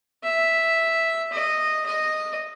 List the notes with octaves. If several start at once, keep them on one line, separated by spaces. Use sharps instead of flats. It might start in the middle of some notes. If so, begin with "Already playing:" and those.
E5
D#5
D#5